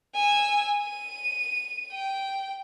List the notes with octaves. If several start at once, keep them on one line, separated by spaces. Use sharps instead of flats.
G#5 E6
D#7
G5